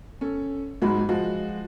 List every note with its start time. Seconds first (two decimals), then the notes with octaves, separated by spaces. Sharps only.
0.21 C#4 A4
0.82 G#2 F#3 G#3 F#4 B5
1.09 F3 G#3 F#4